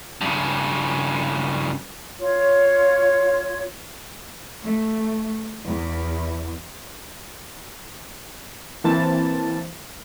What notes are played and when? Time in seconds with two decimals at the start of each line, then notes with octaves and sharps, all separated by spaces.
0.21 G2 C#3
2.20 F4 C#5
4.64 A3
5.66 E2
8.84 E3 A#3 C4 A5